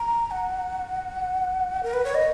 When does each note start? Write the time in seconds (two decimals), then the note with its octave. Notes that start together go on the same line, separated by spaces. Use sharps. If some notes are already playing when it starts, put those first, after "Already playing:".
Already playing: A#5
0.31 F#5
1.83 A#4
1.93 B4
2.05 C#5
2.15 D#5